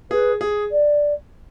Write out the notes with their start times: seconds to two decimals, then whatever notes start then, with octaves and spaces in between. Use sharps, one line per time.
0.11 G#4 B4
0.41 G#4
0.71 D5